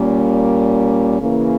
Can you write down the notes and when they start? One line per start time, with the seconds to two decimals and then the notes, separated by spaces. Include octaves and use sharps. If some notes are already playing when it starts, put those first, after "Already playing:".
Already playing: A#2 G3 A#3 C#4
1.19 C#3 E3 A#3 C#4